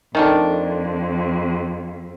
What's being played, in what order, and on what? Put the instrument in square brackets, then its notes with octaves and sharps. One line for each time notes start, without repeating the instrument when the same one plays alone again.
[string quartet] F2 [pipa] D#3 A3 D4